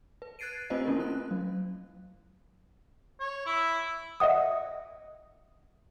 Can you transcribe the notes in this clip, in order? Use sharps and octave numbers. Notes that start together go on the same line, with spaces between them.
B4
F#6 G#6 A6 C7 D7 D#7
A3 C4 F4 B4 C5 D#5
A3 A#3 C#4 E4 F4 A#4
F#6
F#3
C#5
E4
D#5 E5 F#5 D#6